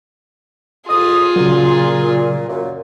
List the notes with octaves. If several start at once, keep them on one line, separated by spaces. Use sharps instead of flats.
C2 F2 F4 G#4 D#6
A#2 C#3 F#3
F#2 A#2